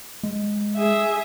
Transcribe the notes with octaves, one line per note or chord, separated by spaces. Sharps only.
G#3
G#4 E5